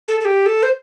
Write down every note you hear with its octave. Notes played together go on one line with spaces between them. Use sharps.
A4
A4
G4
A4
C5